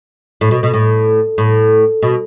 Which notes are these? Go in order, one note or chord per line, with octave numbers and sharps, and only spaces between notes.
A2
B2
B2
A2
A2
B2